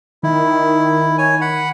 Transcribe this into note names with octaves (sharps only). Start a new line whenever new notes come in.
D#3 E4
C#5 G#5
F#5 B5